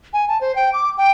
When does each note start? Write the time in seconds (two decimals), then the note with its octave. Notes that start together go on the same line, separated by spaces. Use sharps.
0.13 G#5
0.28 A5
0.41 C5
0.56 G5
0.73 D6
0.98 G5